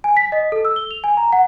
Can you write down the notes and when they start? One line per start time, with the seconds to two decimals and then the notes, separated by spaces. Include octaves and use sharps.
0.04 G#5
0.17 B6
0.32 D#5
0.52 A4
0.65 E6
0.76 G7
0.91 F7
1.04 G#5
1.17 A#5
1.33 F#5